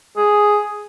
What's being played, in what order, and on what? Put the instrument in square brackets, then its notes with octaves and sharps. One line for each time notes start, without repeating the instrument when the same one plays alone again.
[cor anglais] G#4